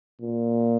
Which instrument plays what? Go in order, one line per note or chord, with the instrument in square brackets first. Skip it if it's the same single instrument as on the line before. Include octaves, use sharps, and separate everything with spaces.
[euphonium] A#2